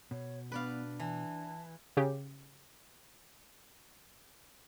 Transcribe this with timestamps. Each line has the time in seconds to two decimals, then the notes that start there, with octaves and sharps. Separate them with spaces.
0.11 B2 C#5
0.52 B3 D4 B4 D5 F5
1.00 E3 A5
1.97 C#3 G4